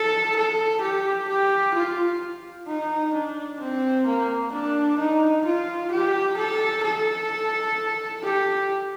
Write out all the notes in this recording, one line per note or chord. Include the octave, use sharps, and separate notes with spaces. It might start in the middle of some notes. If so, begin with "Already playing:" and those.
Already playing: A4
A4
G4
G4
F4
D#4
D4
C4
A#3
D4
D#4
F4
G4
A4
A4
G4